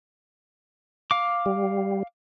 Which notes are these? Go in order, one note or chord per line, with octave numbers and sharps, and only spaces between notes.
F5 D6
G3